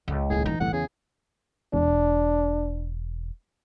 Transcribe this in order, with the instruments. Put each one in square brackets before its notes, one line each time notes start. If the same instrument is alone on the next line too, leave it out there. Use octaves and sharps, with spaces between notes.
[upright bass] C#2
[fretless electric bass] D#1 G#1 A2 [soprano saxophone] G#4
[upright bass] E3 [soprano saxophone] D#4
[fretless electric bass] G1 C2 A2 [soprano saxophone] F#5
[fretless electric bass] E2 C#3 [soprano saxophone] G#4
[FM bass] E1 [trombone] D4